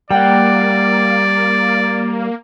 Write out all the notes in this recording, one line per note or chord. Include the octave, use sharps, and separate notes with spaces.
G3 A#3 D5 F#5 G5